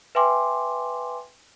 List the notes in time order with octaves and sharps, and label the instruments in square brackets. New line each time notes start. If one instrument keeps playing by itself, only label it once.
[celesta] B4 E5 G5 G#5 C6 D6